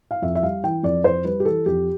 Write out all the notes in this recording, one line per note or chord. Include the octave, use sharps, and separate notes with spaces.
F5
F2 E5
E5
G3 F5
E3 G5
F2 D5
F2 C5
G3 B4
G4
E3 A4
F2 G4